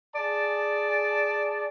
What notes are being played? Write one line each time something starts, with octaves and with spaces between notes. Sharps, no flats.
G#4 D5 A5